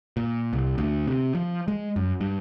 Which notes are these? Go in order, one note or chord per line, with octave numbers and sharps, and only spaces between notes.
A#2
C2
D2
C3
F3
G#3
F#2
G2